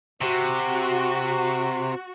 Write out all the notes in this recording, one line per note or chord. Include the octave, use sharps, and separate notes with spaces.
C3 F#4